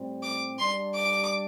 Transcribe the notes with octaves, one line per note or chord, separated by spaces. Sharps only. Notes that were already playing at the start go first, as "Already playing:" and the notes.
Already playing: A2 G3 C4
D6
G3 D4 G4 D5 C6
D6